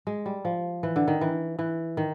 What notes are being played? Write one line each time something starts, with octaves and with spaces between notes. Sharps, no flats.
G#3
G3
F3
E3
D3
D#3
E3
E3
D#3